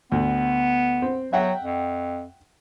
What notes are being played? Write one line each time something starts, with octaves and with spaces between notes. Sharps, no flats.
D2 B3
C4
F#3 E5 F#5 G5
F2